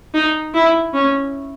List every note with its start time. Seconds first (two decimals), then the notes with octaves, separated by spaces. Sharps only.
0.14 D#4
0.54 E4
0.94 C#4